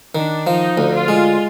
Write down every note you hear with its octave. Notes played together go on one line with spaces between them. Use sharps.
D#3 D4
F3 D#4
D2
F4
G#3